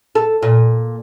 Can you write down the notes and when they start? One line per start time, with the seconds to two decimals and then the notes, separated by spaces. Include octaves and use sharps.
0.15 A4
0.43 A#2